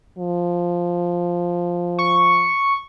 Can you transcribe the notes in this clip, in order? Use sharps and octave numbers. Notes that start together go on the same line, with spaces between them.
F3
C#6